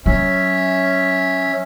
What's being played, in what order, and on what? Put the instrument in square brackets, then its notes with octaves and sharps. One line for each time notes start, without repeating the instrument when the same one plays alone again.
[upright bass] F#3 [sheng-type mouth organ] C#4 E5